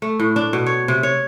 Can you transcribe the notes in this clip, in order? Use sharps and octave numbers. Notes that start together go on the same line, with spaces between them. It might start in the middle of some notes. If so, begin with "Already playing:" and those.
A3
A2
D4
B2
C#5
C3
C#5